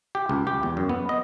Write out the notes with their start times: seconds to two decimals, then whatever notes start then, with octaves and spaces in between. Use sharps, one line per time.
0.15 G4
0.29 C#2
0.47 G4
0.63 E2
0.77 F#2
0.89 B3
1.09 D#5